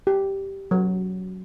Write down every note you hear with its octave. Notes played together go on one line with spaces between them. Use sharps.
G4
F#3